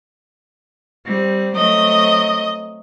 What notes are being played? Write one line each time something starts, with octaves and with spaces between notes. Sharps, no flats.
G3 C4
F#3 A3 C4 D#5